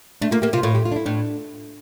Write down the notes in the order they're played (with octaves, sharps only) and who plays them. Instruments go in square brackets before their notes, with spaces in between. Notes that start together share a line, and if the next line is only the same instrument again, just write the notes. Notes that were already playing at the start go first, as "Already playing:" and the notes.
[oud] A3 [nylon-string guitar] D4
[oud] A#3 [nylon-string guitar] F4
[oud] A#3 [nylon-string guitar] G4
[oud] C3 [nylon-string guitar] F4
[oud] A2 [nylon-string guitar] F4
[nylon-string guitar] G4
F4
D4
E4
[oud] A2 [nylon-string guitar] D4